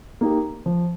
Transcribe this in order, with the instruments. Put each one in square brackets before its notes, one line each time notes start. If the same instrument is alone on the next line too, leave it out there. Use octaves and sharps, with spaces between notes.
[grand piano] A#3 D#4 G4
F3